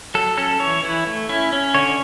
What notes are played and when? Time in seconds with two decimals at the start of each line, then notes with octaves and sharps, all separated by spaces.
0.14 F#3 A4
0.37 C#4 A4
0.60 E3 C#5
0.83 E3 E4
1.07 A3
1.29 C#4 E4
1.53 C#4
1.74 D3 C#5